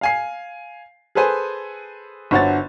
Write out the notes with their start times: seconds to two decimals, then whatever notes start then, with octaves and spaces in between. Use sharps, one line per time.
0.01 F5 G#5 C7
1.15 G#4 A4 B4 C5 G#5
2.31 G1 D3 F#4 C5 C#5 A6